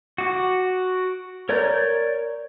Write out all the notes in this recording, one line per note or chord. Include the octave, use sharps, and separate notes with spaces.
F#4 D6
A#4 C#5 D5 A#5 G6